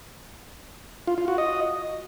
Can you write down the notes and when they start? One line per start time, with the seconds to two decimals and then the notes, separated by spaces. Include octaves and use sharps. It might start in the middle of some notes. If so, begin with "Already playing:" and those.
1.07 F4
1.18 F4
1.28 F#4
1.38 D#5